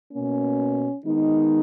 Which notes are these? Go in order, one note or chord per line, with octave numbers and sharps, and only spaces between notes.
B2 A#3 C#4
D#3 G#3 B3 D#4